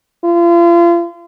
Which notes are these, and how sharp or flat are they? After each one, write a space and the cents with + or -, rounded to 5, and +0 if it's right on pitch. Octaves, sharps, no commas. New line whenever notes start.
F4 -35